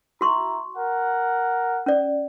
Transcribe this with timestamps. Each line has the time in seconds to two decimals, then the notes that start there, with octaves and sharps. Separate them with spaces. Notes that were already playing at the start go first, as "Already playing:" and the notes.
0.21 E4 F#4 A#5 C6 C#6
0.76 A#4 F#5
1.86 C#4 D5